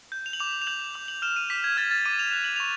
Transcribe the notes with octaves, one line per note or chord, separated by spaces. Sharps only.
G6
F7
F#7
D6 F7
F#7
F7
G6 F#7
F#7
D6 F#7
F#7
F6 E7
D#7
D6 B6
G#6
F6 A6
A6
D6 D#7
F7
F#6 F7
F#7
C#6 F7